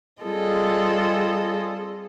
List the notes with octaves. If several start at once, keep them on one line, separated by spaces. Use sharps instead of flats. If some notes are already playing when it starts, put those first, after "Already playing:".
G3 C4 F4 G#4 A4 D#5